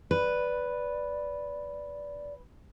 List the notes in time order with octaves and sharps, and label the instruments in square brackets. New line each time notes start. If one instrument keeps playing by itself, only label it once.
[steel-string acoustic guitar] B4 [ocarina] D5